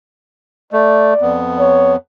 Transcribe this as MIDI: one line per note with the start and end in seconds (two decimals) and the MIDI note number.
0.73 1.14 57
0.73 1.40 74
1.21 1.96 41
1.21 1.96 59
1.59 1.95 73